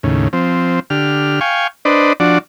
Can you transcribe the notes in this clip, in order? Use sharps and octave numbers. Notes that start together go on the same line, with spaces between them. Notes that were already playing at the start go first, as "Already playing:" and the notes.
D#2 A2 C#3
F3 C4
D3 G4 F6
F5 G5 G#5 C#6
D4 B4 C5 D5 D#5
F3 D4 F#4 D5